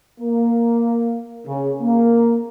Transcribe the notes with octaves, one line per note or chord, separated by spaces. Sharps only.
A#3
C#3
A#3